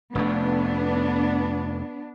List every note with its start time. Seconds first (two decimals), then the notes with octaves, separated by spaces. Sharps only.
0.15 F1 F2 A3 B3 D4